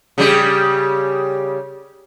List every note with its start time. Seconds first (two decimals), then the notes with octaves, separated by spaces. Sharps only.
0.18 C#3 G3 G4